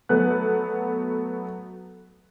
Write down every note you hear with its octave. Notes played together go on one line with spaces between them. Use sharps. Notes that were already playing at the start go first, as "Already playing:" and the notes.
F#3 A3 B3 F#6